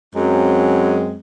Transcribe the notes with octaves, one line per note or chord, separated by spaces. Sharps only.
F#2 F#3 G#3 C4